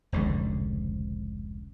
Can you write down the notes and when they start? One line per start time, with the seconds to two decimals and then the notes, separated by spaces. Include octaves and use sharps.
0.12 F1 C#2 G#2 D3